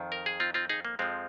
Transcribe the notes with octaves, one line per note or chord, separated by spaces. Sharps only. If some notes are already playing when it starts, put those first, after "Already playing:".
Already playing: F2 D#3
A#4
G#4
C4 F4
C4 F4
D#4 G#4
A#3
F2 F3 G#3 C4